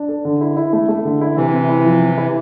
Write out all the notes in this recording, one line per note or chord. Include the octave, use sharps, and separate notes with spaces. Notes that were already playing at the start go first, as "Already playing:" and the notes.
Already playing: D4
A4
D3
E4
E4
A3
A3
D3
E4
C3 E3 E4
C4
E4
F3
C4
E4